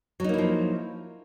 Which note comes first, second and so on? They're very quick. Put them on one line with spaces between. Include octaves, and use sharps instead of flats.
F#3 D#4 A#3 E4 F3